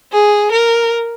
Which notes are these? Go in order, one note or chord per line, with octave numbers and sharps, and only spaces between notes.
G#4
A#4